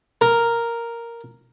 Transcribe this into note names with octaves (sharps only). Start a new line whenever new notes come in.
A#4